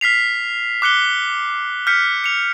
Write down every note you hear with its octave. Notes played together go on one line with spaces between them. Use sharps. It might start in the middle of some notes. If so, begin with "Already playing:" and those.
F6 B6 C7 F7
D6 F#6 C#7 G7
F6 G6 B6 C#7
C#7 F7